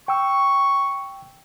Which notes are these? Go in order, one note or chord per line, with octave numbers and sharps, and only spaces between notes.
G5 C#6 E6